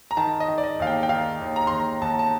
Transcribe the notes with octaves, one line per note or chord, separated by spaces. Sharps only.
A#5
D#3 A5
D#5
D#3
D5
D#5
D#2 F5
G5
G5
D#3 F5
D#2
A#5
D#2 C6
A#5
D#2 A5
A5